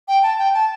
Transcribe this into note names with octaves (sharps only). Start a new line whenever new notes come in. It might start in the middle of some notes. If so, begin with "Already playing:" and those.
G5
A5
G5
A5